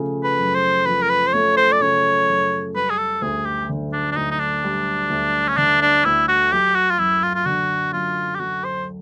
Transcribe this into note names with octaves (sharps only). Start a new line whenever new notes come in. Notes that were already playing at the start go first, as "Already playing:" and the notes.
Already playing: C#3 F3 A3
B4
F#2
C5
F3 B4
A#4
B4
C5
A3 C#5
C5
D5
C#3 C#5
F#2
G3 B4
G#4
A4
D2 G#4
G4
D3
D4
D4
D2 D#4
D#4
D4
G3
D2
C#4
D3 D4
D4
D2 E4
F#4
F#3 G4
F#4
F4
F#2 E4
F4
F4
D3 F#4
F#2 F4
G4
F#3 F#4
C5